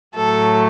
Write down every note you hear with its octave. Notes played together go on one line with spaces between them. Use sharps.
A2 F#3 A3 A4